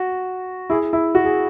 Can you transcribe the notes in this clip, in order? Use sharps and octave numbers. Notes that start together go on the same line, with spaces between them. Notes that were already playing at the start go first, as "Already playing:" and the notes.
Already playing: F#4
E4 G#4
E4
F#4
G#4